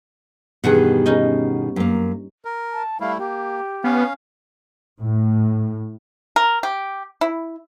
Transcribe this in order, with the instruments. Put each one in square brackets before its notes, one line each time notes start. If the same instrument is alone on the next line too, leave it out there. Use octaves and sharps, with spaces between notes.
[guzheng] E2 G2 F#5 [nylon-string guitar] B2 D#3 G#4
[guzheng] C#4 D#4 D#5
[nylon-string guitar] F#2 A#3
[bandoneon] A#4
[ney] A5
[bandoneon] G3 A3 E4 [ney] F5
[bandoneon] A#3 [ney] G4
[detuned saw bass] B3 [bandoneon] C#4 F5
[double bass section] A2
[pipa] A#4
G4
E4